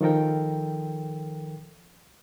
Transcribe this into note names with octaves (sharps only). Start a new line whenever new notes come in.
D#3 F3 A4 A#4 G5